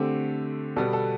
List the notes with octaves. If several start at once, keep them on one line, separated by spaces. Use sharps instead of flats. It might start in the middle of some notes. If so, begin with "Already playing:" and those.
Already playing: D3 A3 C4 G4
B2 G3 B3 A4
A4